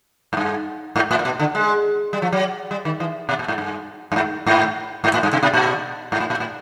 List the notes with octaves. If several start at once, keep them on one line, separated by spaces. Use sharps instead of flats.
G#2
G2
G#2
A2
A#2
B2
D3
G#3
G3
F3
F#3
G3
D#3
E3
B2
A#2
G#2
G2
G2
G#2
G#2
G#2
A2
G2
C3
B2
A#2
G#2
A2
A#2
A2